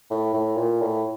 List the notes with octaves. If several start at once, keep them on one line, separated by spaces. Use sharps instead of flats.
A2
A2
A#2
A2